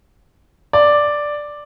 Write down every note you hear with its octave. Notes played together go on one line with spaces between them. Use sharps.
D5